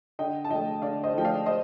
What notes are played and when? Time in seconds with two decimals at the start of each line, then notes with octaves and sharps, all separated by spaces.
0.19 D3 D#5 G5
0.44 A5
0.50 F3 A3 D#5 G5
0.82 D3 D5 F5
1.03 C5 D#5
1.14 F3 A3 G5
1.25 D5 F5
1.46 C5 D#5